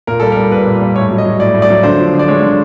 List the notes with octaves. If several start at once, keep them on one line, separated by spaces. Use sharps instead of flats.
A#2 A#4
G3 A4
A#4
G3
A#2 B4
A#2
G3
A2 C#5
F#3
D#5
F#3
A2 D5
A2
D5
F#3
D3 C5
F3
D3
D5
G#3 C#5
D3